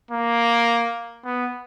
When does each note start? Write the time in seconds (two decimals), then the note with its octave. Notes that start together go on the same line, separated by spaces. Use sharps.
0.11 A#3
1.25 B3